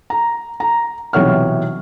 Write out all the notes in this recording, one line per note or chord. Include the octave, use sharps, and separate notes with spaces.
A#5
A#5
B1 C3 E3 C#5 F#5 F6